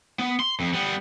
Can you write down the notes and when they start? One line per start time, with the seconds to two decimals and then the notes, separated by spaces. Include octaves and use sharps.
0.19 B3
0.40 C6
0.60 F2
0.74 G3 B3